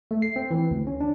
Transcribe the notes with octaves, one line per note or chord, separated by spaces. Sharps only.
A3
C7
C4
E3
D2
C#4
D4